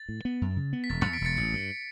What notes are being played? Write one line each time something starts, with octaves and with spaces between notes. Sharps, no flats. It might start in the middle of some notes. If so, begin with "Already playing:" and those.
Already playing: A6
A2
B3
F#2
C#3
B3
B6
E1 A6
A6 C#7
E2
B6 D7
E1 A6 C#7
A1 A6 C#7
G2